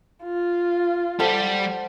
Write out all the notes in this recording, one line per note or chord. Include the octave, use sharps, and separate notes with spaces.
F4
G3 G4 A4 C5 F#5